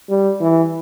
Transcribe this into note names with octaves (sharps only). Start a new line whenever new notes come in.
G3
E3